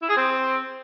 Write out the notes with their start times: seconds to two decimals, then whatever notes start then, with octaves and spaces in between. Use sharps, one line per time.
0.01 E4
0.09 G#4
0.16 C4